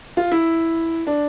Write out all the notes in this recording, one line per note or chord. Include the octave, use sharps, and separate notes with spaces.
F4
E4
D4